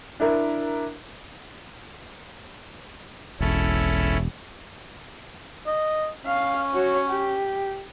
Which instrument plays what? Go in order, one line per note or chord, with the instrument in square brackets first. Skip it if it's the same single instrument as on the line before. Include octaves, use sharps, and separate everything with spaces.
[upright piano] D4 E4 A#4
[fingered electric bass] E1 [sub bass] A#1 [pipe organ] C#4 E4 A4
[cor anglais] D#5
[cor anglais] C#4 [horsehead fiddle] F5
[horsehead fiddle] F#4 C#5
G4